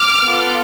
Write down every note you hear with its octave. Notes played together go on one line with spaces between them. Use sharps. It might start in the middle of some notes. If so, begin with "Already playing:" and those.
Already playing: D6 F6
B3 F4 A4